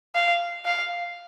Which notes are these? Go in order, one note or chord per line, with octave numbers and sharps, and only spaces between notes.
F5
F5